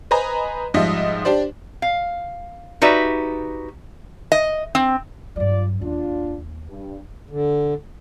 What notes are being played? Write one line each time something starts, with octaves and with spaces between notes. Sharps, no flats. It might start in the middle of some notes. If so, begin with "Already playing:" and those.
B4 C5 D#5 G#5 A#5 B5
G#2 F3 G3 D#5 E5
D4 G4 C5 D5
F5
D#4 F#4 G4 B4 D5 E5
D#5
C4
G2 F#3 F4 D5
D#2 D4 F4
G2
D3